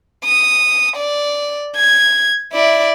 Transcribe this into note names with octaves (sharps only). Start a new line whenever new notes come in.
D#6
D5
G#6
E4 D5